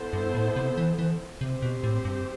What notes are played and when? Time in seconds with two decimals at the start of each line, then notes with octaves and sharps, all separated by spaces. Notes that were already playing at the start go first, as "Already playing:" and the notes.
Already playing: B3 E4 A4 C5
0.13 G2
0.35 A2
0.56 C3
0.77 E3
0.99 E3
1.41 C3 C4 G4 C5
1.62 B2
1.84 A2
2.05 G2